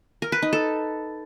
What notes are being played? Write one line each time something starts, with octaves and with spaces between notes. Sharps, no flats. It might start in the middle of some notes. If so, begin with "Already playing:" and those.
A#4
B4
D#4
A4